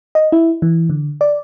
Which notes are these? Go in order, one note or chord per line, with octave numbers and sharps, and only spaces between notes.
D#5
E4
E3
D3
D5